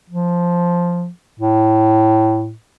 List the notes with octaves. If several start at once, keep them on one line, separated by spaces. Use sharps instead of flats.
F3
A2